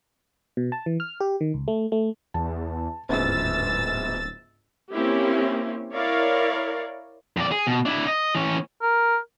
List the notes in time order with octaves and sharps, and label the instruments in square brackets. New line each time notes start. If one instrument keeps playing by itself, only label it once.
[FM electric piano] B2
A5
E3
F6
G4
D#3
C#2
A3
A3
[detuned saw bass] E2 [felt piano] A5
[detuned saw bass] D1 [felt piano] G1 C#2 G#2 [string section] E6 A6
[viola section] A#3 C4 C#4 E4 G4
E4 A#4 C#5 D5 F5
[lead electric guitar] F2 D5
G#4
B2
D4 E4
D#5
E3 C#4
[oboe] A#4